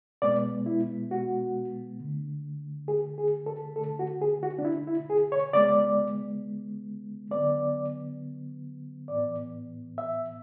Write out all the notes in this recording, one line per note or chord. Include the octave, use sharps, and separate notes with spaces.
B2 G#3 B3 D5
E4
F#4
D3 A3
G#4
G#4
A4
D3 A3 A4
F#4
G#4
F#4
D4
E4
E4
G#4
C#5
C#3 G#3 B3 D5
D3 F#3 B3 D5
A2 E3 B3 D5
E5